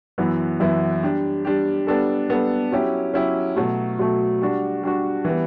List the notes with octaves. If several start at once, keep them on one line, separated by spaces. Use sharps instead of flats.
F#2 E3 B3 E4
F#2 E3 B3 E4
G3 D4 G4
G3 D4 G4
G3 B3 D4 A4
G3 B3 D4 A4
F#3 C#4 E4 G4
F#3 C#4 E4 G4
B2 F#3 A3
B2 F#3 A3
G3 D4 F#4
G3 D4 F#4
E3 G3 B3